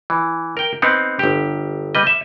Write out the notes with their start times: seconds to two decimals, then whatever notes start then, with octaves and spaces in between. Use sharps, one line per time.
0.10 E3
0.57 A#4 G5
0.82 B3 C4 D#4
1.19 G1 G4
1.95 G3 B4 D#5
2.07 E5